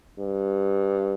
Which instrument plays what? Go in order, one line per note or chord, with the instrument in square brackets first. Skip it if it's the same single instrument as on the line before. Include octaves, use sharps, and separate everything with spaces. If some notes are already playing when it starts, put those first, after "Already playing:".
[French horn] G2